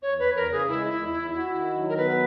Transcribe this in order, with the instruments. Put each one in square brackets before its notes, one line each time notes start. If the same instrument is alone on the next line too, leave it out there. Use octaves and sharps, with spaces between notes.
[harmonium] E2 [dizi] C#5
[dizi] B4
[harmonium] E2
[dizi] A#4
[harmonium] C#3
[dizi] G#4
[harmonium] G#3 [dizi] E4
[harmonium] E2 [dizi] E4
[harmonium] E2 [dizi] E4
[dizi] E4 [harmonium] F#4
[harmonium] D#3
F#3
[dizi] A#4
[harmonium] B3 [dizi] B4